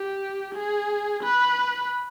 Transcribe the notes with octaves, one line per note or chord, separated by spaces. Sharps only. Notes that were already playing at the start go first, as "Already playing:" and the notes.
Already playing: G4
G#4
B4